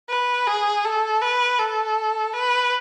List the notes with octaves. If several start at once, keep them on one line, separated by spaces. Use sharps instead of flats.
B4
G#4
A4
B4
A4
B4